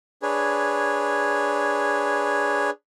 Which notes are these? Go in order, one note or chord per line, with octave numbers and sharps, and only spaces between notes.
D4 G#4 B4 C#5